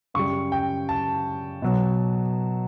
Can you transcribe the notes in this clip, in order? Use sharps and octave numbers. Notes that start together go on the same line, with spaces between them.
F#2 C#3 G3 C#6
G5
A5
B2 F#3